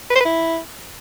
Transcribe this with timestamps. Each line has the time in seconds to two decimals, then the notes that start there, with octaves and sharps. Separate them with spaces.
0.10 B4
0.15 C5
0.20 B4
0.25 E4